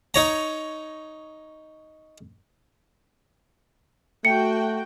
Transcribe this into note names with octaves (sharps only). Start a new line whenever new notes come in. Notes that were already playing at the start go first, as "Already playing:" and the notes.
D#4 C#5 A#5
A3 F#4 G5 C#7